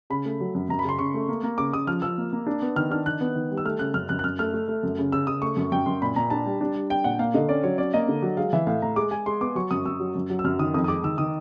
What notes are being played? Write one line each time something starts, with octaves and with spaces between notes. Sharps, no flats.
C#3 B5
A3
F#3
F#2
F#2 A#5
B5
C#3 C6
C#3 C#6
A3
A#3
A#3
C#3 D6
C#3 D#6
F3 F6
F3 E6
A#3
A#3
D4
B3
D#3 F6
D4 F6
D#3 F#6
B3
D#3
G3
E6
A3 F6
C#3 F#6
F#2 F6
F#2 F#6
F#6
F#2 F6
A3 F6
A3
A3
F#2
C#3
C#3 E6
C#3 D#6
A3 C#6
F#2
F#2 G5
F#2 C6
A#2 B5
A#2 A#5
D4 A5
G3
D4
G3
D4 G5
A#2 F#5
A#3 F5
D3 D#5
C#4 D5
F#3 C#5
C#4 D5
A#3 D#5
D3
F#3
G#3 F5
E3 E5
A2 F5
A2 A#5
G#3 D6
G#3 G#5
G#3 C6
B3 D6
F#3 C#6
F#2 D#6
F#2 E6
F#3
F#2
F#3
E6
F#2 F6
D#3 D#6
F2 D#6
D#6
G#3 D6
D#3 E6
D#3 D#6